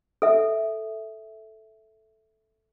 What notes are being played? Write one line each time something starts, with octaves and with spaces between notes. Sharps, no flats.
A4 E5